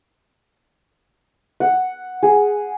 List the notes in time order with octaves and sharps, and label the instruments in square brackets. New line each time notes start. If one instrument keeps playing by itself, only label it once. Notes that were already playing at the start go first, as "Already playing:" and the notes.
[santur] F#5
G#4